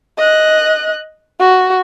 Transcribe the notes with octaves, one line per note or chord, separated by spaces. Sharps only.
D#5 F#6
F#4